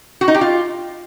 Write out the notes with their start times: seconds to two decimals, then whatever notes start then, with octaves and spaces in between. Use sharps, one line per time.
0.21 F#4
0.28 D#4
0.34 G4
0.41 F4